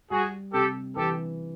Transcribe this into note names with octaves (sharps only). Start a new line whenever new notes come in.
G3 F#4 G#4
C3 G4 A4
E3 G4 A4